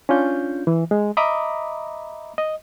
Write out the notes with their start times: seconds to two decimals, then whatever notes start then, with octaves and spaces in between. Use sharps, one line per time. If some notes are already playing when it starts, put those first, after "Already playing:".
0.09 C#4 D4 F4 G6
0.67 E3
0.91 G#3
1.17 D#5 E5 A#5 B5 D6 D#6
2.38 D#5